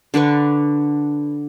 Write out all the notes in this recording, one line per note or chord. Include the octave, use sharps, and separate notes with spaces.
D3 D4 B4 C#6